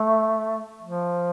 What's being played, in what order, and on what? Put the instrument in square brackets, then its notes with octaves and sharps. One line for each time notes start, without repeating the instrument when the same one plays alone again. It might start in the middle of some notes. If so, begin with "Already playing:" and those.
Already playing: [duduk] A3
F3